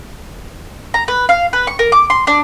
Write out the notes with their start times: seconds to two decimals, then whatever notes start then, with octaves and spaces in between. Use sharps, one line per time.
0.94 A#5
1.08 B4
1.29 F5
1.53 B4
1.67 C#6
1.79 A#4
1.92 D6
2.10 C6
2.27 D4